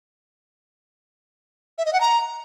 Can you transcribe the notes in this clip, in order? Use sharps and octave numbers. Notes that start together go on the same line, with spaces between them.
E5
D#5
F#5
A#5